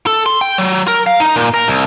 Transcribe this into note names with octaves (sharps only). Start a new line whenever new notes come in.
A4
C6
G5
F#3
A#4
F5
D#4
A#2
A#4
C2